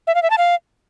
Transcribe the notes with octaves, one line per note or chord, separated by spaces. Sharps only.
E5
F5
E5
A5
F5